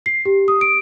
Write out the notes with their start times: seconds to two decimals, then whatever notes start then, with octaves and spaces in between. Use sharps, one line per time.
0.06 C7
0.25 G4
0.48 D#6
0.61 D7